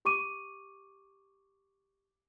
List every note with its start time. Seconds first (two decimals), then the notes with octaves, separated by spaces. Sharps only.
0.05 G4 C#6 D6 D#7